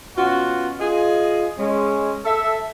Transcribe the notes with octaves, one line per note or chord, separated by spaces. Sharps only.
B2 C#4 F4 F#4
F4 G#4 D#5
G#3 C#4
A4 E5